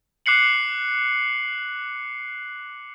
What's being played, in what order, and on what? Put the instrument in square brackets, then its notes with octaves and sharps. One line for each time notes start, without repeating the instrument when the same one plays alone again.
[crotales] D6 F#6 C7 C#7 F#7